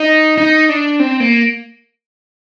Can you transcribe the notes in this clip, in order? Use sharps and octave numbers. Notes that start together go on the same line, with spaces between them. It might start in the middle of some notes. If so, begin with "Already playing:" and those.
Already playing: D#4
D#4
D4
C4
A#3